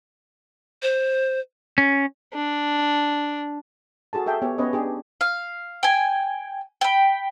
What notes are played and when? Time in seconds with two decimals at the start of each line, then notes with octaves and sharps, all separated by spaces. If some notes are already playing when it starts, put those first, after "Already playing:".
0.82 C5
1.78 C#4
2.34 D4
4.13 F#4 G#4 A4 A5
4.26 G#4 A4 E5 G5
4.42 B3 G4 C#5
4.58 B3 C#4 B4 C#5 D#5
4.73 D4 G4 G#4
5.21 F5
5.83 G5 G#5
6.81 G5 B5